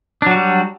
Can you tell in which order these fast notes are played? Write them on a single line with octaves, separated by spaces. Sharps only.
D4 F#3 F#4 G3